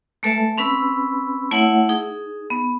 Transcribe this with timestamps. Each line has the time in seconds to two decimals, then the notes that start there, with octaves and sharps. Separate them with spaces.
0.23 G#3 A3 A4 B4 E5 A5
0.58 C4 C#4 B4 B5 E6
1.51 A3 E4 C#5 E5 F#5
1.89 D#4 G#4
2.50 B3